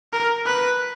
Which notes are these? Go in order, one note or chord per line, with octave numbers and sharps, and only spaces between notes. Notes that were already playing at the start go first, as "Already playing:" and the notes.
A#4
B4